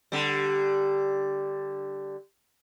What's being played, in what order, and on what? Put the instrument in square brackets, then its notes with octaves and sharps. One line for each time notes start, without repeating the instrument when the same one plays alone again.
[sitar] D3 G3